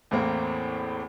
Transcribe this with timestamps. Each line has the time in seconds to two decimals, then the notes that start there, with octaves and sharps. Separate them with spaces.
0.11 E2 A2 A3 A#3 C4